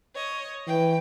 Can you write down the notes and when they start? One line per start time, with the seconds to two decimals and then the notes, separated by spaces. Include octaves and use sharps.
0.15 C#5 D#5
0.67 E3 B4 G5